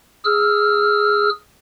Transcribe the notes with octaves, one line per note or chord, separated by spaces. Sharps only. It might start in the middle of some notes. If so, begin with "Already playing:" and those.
G#4 E6 F6